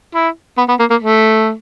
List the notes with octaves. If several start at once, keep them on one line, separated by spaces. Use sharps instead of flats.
E4
B3
B3
A#3
A#3
A3